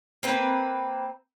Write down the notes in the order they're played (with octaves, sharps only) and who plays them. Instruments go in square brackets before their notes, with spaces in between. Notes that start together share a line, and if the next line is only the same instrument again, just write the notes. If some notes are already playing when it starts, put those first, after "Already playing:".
[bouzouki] A#3 C4 B4